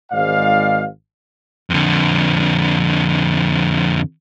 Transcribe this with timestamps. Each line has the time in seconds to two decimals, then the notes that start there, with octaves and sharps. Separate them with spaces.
0.12 G#1 G#2 D5 F5
1.70 F2 D3